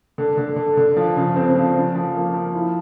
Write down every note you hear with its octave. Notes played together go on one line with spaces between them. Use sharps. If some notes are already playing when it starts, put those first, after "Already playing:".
D3
D3
D3
D3
F3
C#3
C4
F3
C#3
F3
A#3
F3
E4